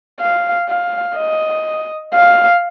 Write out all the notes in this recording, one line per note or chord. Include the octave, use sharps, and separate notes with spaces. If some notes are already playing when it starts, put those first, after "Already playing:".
F5
F5
D#5
F5